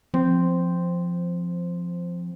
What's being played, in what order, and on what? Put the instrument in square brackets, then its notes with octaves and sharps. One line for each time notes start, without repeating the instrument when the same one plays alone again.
[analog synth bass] F3 [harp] C4